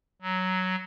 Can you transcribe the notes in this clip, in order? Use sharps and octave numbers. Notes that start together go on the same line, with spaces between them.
F#3